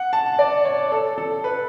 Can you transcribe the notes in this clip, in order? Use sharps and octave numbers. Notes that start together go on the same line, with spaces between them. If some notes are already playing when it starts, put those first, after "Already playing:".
Already playing: F#5
A5
D5
C#5
A4
A4
B4